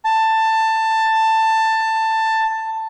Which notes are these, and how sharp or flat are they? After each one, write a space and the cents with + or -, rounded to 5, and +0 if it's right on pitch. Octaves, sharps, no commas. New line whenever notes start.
A5 +15